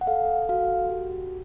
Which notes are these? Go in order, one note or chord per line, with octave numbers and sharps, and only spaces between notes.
F#5
A4 F5
F#4 F5
G4